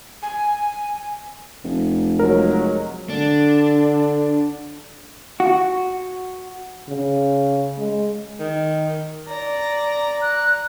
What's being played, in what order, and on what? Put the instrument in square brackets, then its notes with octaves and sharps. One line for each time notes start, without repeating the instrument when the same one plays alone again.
[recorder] G#5
[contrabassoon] F1
[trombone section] F#3 G#3 [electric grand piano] A#4
[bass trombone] D3 [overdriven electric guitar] D4
[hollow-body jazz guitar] F#4
[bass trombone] C#3
G#3
[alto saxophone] D#3
[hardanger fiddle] D5 A#5
[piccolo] F#6